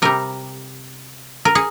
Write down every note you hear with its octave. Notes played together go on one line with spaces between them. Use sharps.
C3 G3 A#4
A#4
G#4